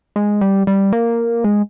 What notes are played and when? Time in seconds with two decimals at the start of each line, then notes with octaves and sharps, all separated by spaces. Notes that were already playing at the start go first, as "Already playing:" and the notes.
0.16 G#3
0.41 G3
0.67 G3
0.93 A#3
1.44 G#3